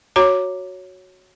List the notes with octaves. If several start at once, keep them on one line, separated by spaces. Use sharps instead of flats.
F#4 C#5 A#5 D6